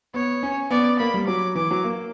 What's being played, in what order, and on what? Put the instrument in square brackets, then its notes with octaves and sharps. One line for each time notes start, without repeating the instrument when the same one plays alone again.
[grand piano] B3 [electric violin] C#5
[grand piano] C#4
[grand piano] B3 [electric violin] D5
[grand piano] A#3 [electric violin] B5
[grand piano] G3
[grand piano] F#3 [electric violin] D6
[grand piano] E3 [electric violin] D6
[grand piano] F#3
A#3